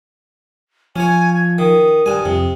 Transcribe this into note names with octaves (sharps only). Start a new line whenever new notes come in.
F3 C#4 C#5 G#5
G#6
D#3 D#6
G2 G3 G#5
F2 C3